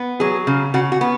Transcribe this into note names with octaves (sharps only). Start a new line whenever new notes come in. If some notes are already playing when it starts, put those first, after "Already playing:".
Already playing: B3
F#3 G#4
C#3
C#3 F#4
F#4
B3